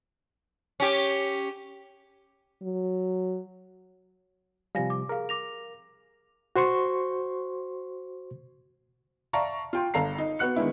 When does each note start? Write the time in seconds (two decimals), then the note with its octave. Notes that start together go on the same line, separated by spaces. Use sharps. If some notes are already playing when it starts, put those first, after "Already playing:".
0.80 C#4 G4
2.63 F#3
4.75 C3 F3 G3 F5 G#5 A#6
4.90 D6
5.09 G#4 A#4 F5
5.29 D6 A#6 F7
6.56 F#4 C5 C6 C#6
9.33 D5 E5 F5 A5 A#5 C#6
9.73 F4 G5 C6
9.94 G1 A4 F5 A#5 C7
10.18 D#4
10.39 B3 F#4 F#6 C#7
10.56 D#3 G#3 B3 D4 E4